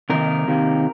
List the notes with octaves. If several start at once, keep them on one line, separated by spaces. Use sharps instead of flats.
C3 D#3 A#3 A#4
C3 D#3 A#3